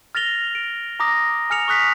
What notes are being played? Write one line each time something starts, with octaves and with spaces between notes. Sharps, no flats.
F6 A6 A#6 F7 G7
D7
A#5 D6 D#6 A#6
G#5 F6 C#7 F7
C#6 D#6 F#6 B6